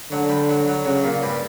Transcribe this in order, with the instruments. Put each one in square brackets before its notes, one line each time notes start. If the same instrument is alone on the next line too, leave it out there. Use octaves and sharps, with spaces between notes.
[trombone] D3 [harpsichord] F#3
[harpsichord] G3
F#3
F#3
[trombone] C#3 [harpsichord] F#3
[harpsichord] A#2
G2